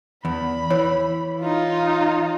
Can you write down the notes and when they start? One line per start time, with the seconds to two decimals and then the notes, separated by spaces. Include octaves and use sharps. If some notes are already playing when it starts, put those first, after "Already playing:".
0.25 E2 B5
0.70 E3 C#5
1.41 D#4 F4